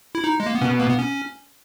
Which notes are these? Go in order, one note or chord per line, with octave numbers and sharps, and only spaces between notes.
E4
D#4
G#3
A#3
B3
B2 C#4
A#3
B3
C#4